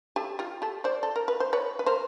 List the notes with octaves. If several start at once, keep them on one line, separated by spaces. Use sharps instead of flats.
G4 A4
F4 G4
G4 A4
C5 D5
A4
A#4
B4
C5
B4 C#5
B4
A#4 C5